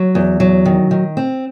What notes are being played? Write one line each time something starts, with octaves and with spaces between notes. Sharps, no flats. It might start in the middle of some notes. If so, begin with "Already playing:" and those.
Already playing: F#3
E2
F#3
D#3
D#3
C4